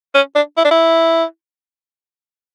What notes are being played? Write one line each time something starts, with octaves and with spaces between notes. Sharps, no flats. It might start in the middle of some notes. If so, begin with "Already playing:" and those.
C#4
D4
E4
D4
E4